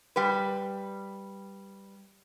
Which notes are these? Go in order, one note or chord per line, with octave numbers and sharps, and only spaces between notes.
G3 B4